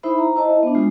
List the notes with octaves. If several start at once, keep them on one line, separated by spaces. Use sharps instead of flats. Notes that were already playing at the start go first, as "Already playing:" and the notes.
D#4 E4 C5 E5 B5
A#5
E4 C5 D#5 A5
E5
B3 D4
G#3 F4